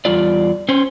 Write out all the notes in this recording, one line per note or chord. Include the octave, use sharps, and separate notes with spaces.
E2 G3 F4 D5
C#4 C5